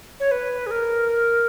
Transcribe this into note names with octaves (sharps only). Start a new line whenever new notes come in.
C#5
B4
G#4
A#4